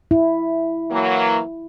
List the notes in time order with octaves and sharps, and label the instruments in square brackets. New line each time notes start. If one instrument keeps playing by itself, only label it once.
[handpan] E4
[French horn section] E3 F#3 A#3